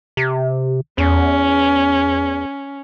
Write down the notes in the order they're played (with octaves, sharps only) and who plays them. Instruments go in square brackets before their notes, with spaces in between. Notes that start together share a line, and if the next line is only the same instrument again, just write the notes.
[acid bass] C3
[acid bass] E2 [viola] C#4